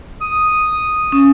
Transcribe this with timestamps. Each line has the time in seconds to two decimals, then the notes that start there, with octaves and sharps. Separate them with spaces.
0.21 D#6
1.12 C#4 D#6